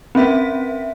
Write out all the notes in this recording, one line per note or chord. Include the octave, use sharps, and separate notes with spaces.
C4 C#4 E5 B6